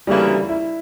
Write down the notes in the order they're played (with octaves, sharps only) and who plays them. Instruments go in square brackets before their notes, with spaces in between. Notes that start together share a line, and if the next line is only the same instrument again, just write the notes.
[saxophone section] D2 C#3 E3 A#3 E4 [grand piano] G3
[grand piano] E4